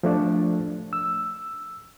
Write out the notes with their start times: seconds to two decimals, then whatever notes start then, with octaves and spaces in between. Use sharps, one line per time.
0.03 F3 A3 D4
0.93 E6